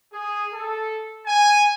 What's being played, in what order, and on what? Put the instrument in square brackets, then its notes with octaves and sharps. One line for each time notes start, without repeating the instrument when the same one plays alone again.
[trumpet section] G#4
A4
G#5